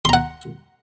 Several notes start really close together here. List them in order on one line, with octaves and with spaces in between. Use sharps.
C6 A#5 F#5